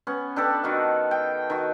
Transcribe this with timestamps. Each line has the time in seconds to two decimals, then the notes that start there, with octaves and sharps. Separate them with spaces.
0.07 B3 C#4
0.36 D4 G4 A4 B4
0.64 D#3 F#4 F5
1.11 G5
1.50 D#3 F#4